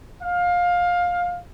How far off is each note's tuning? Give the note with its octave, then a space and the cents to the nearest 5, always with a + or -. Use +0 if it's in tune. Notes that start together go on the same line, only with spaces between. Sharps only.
F5 +20